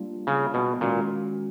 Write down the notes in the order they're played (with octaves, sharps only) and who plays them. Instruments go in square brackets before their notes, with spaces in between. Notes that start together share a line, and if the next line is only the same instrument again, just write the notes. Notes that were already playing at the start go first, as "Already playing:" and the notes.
Already playing: [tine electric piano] G3 A#3 D4 F4
[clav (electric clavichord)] C#3
B2
[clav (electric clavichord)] A#2 [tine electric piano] D#3 G#3 C#4 F#4